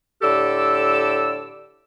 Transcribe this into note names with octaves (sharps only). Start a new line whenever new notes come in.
A2 D3 G4 A4 D6 E6